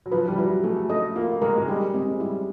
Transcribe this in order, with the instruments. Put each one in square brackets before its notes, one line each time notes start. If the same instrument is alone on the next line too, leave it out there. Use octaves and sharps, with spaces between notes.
[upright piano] F#3
[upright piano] F3 [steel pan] B4
[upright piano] G3
[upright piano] F#3 [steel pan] E4
[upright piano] A3 [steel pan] G#4
[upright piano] A3 [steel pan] D#5
[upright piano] A#3 [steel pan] F4
[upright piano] G#3 [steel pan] A#4
[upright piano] G#3
[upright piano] G3 [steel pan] G4
[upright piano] G#3 [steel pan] C4
[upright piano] G3 [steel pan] E4